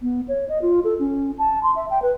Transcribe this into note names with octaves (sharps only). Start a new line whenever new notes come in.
B3
C#5
D#5
F4
A4
C#4
A5
C6
E5
G5
B4